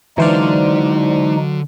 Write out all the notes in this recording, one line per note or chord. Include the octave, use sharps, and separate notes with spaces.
D3 E3 F#3 G#3 D#4 C5 D5 F5